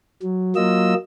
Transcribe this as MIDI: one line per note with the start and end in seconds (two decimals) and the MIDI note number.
0.22 0.55 54
0.56 0.94 54
0.56 0.94 58
0.56 0.94 65
0.56 0.94 75
0.56 0.94 88